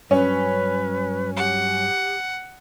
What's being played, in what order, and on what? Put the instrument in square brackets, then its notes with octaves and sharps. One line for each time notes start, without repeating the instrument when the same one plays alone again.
[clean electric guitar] G2 F#3 [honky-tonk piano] C#4 [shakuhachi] B4
[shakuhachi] G4 [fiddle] F#5